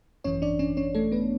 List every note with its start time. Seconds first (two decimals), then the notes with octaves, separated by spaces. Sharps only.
0.24 G#1 F#2 E3 C#4 C#5
0.42 D4 D5
0.59 C#4 C#5
0.77 C#4 C#5
0.95 A3 A4
1.12 B3 B4